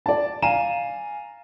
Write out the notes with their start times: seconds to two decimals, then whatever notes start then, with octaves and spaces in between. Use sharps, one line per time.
0.06 D5 A5
0.42 F5 G#5 A#5 D#7 E7